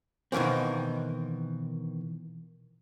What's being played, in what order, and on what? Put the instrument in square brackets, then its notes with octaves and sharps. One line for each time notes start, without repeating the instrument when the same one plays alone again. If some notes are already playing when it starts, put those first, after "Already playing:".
[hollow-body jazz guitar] B2 D#3 E3 A#3 C4